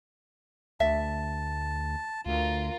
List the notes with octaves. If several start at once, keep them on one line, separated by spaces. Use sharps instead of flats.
D2 E5 A5
D2 F4 A#4